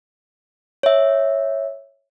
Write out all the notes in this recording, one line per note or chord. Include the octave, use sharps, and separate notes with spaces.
C#5 E5